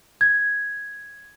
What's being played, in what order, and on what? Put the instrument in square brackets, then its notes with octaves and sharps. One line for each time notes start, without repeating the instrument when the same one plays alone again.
[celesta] G#6